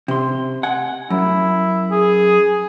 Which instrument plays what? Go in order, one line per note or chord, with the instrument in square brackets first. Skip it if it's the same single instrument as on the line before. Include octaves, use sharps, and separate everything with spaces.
[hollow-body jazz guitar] C3 C6
F#5 G#5
[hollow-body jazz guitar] F#2 [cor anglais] E4
[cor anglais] G#4